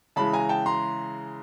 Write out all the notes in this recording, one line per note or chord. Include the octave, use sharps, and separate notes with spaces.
C#3 E3 G#3 A5 B5
G#5 A#5
G5 A5
A#5 C6